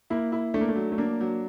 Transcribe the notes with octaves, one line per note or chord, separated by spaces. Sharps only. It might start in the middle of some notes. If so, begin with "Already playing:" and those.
A#3 E4
E4
A3 D4
A#3
A3
F#3
A3
A#3 D4
F#3